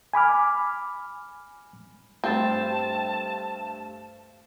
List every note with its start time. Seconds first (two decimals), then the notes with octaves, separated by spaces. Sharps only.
0.13 G#5 B5 D6 F6
2.24 G2 A3 C4 A5 A6